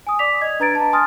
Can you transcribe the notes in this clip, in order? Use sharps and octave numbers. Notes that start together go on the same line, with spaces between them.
G#5 D#6
D5 D6 B6 F7
D#5 G#6
D4 B4 A#5 G#6 A6 D7
A5 A#5
G#5 C6 D#6 F6 A6